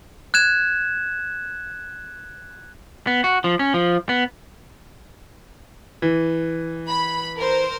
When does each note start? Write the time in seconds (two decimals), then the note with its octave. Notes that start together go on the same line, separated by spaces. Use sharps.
0.34 F#6 G#6 E7
3.07 B3
3.24 F#4
3.44 F3
3.59 C#4
3.74 F3
4.09 B3
6.02 E3
6.88 B5
7.38 A#4 C5